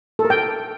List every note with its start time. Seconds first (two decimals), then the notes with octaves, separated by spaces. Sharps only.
0.19 A4
0.25 A#4
0.30 G5